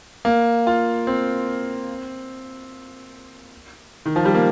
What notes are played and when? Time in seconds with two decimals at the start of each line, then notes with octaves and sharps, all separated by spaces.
0.25 A#3
0.67 F4
1.07 C4
4.06 D#3
4.16 F3
4.25 G3
4.35 A#3